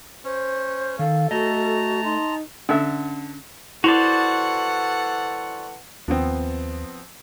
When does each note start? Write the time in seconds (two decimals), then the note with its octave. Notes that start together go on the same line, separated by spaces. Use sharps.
0.24 C#4 C5
0.99 D#3 A4 F5
1.31 A3 F#4 D#5 A5 A#5
2.05 D#4 C6
2.69 D3 C#4 A4 E5
3.84 E3 E4 F#4 A4 C5 D5 F#5 F7
6.08 D#2 F3 B3 C4